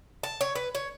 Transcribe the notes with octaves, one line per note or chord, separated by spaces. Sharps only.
A5
C#5
B4
C#5